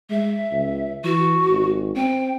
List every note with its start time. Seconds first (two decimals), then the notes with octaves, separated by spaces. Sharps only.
0.10 G#3 E5
0.52 C#2
1.04 E3 F#4
1.49 G#1
1.97 C4 G5